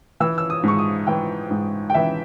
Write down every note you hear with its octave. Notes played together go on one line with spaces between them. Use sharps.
E3 E6
E6
D#6
G#2 C#6
D#6
E3 G5
G#2
G5
E3 E5